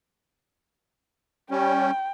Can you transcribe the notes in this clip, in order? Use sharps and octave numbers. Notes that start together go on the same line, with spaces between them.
G3 C#4 G5